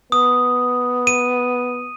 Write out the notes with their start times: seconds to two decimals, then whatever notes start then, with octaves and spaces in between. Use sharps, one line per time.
0.12 B3 D#6
1.07 D#7